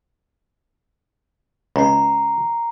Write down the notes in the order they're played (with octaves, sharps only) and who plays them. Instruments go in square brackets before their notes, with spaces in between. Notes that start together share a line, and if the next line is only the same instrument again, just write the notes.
[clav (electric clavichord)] C#2 [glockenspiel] A#5 C7